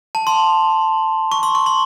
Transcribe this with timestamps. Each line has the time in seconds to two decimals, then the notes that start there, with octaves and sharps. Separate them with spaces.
0.15 A5
0.27 C6
1.32 C#6
1.43 C6
1.55 C#6
1.66 C6